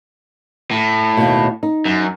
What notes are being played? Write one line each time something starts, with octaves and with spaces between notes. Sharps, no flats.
A2
D#2 B2
D#4
F#2